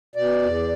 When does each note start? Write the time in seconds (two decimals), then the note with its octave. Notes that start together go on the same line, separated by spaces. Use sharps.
0.16 B2 D5
0.42 E2